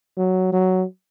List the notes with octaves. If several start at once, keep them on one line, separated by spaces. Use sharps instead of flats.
F#3
F#3